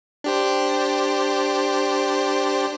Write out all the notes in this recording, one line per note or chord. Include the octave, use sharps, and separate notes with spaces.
D4 G4 C5